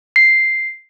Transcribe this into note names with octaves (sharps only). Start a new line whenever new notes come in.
C7